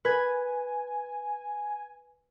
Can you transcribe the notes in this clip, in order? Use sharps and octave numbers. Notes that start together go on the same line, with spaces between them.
B4 G#5 G#6